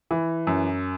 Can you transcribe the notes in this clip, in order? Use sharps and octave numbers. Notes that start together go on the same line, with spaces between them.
E3
F#2